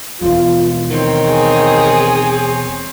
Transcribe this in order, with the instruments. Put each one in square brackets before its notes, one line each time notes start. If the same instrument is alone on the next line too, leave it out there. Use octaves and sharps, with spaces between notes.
[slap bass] E1 D#2 [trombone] F4
[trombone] D#3 [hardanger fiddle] C4 C#5
[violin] G#4